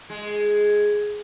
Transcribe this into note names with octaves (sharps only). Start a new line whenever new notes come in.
G#3